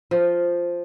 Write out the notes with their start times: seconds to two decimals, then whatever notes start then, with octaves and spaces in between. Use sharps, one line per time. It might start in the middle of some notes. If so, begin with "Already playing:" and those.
0.11 F3